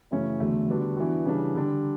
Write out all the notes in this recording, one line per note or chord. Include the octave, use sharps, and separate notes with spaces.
F#2 C#3 E3 A3 C#4
E2 D3 F#3 A3
D3 G3 B3 D4 F#4
E3 B3 D4 F#4
C#3 E3 G3 D4
D3 G3 D4